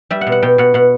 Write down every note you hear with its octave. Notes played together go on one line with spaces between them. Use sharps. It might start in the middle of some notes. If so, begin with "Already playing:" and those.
G3 E5
F#5
B2
F#5
B2 G5
B2 F#5
B2 F#5